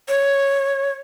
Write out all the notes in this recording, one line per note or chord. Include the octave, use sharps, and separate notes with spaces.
C#5